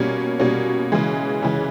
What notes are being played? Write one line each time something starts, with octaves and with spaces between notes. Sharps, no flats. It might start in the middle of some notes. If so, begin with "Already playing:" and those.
Already playing: B2 G3 A#3 C#4
B2 G3 A#3 C#4
C#3 E3 G#3
C#3 E3 G#3